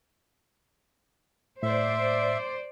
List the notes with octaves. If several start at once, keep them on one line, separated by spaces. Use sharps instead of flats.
A2 C5 D5 E5